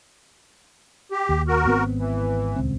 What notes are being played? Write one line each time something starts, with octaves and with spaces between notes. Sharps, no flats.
G4
D#2
F#4 A#4
G#1 B3 C4
E3
D#1 C#2 C4